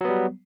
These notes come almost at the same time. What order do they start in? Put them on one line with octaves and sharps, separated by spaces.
F#3 B3 G3